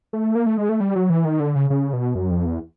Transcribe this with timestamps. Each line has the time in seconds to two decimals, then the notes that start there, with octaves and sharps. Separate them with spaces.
0.13 A3
0.35 A#3
0.46 A3
0.58 G#3
0.69 A3
0.80 G3
0.96 F#3
1.10 E3
1.25 D#3
1.40 D3
1.55 C#3
1.70 C#3
1.93 B2
2.15 F#2
2.30 F2
2.46 E2